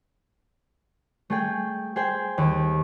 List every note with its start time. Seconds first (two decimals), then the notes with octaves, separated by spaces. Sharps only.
1.30 A3 G#4 G5
1.96 G#4 C5 G5
2.38 D#2